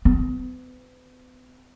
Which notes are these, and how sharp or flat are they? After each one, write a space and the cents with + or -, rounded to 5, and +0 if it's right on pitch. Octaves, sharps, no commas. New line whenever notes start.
B3 +40